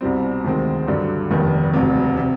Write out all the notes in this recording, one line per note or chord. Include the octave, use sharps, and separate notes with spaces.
C2 B2 G3 C4
D2 C3 D#3 G#3 C4
G2 D3 F#3
F1 D#2 D#3 G3 B3
E1 D2 C3
C3